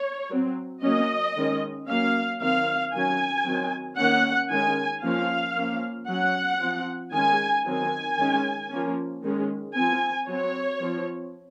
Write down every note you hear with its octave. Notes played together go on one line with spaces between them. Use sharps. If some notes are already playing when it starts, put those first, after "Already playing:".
Already playing: C#5
F#3 C4
F#3 A#3 C#4 D#5
D#3 G#3 C#4
F#3 A#3 C#4 F5
D#3 F#3 C4 F5
D#3 F#3 C#4 G#5
D#3 F#3 C4
D#3 A#3 C#4 F#5
D#3 G#3 C#4 G#5
F3 A#3 C#4 F5
F3 A#3 C#4
F#3 C#4 F#5
F3 C4
D#3 G#3 C#4 G#5
D#3 F#3 C4 G#5
D#3 G#3 C#4
F3 A#3 C#4
D#3 G#3 C#4
F3 C4 G#5
F#3 C4 C#5
F3 C4